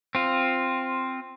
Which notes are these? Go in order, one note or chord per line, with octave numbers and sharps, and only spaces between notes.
C4 F4